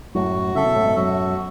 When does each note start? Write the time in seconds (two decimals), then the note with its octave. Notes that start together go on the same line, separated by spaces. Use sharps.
0.15 F#2 A2 F#4
0.55 C#3 A4 E5
0.65 B2
0.76 A2
0.85 G#2 B2
0.96 F#2 F#4